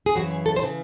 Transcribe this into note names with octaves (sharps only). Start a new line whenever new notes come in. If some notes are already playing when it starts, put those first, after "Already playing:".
G#4
F#2 C#3 E3 F#4
G#4
A4
C5
C#3 E3 A4